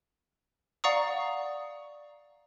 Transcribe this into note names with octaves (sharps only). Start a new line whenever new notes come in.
D5 F5 F#5 A#5 C#6 D#6